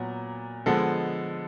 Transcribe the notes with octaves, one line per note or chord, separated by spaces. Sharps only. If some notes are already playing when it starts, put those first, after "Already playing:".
Already playing: A#2 F#3 B3
D3 F3 G#3 B3 A4